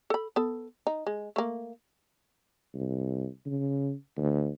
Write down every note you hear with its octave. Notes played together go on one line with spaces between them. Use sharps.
A4 B5
B3 A4
D#4
G#3
A3 A#3
C2
C#3
D2